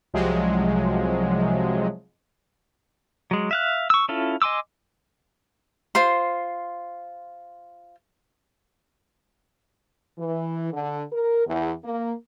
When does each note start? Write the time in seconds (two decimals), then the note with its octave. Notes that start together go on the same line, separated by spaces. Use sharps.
0.13 C2 C3 F3 F#3 G#3
3.31 F#3 G#3
3.51 E5 F5 F#6
3.90 C#6 E6
4.09 C#4 E4 F4 A4
4.42 D#5 G#5 C6 D6 E6
5.95 F4 C5 C6
10.18 E3
10.73 D3
11.12 A#4
11.47 E2
11.84 A#3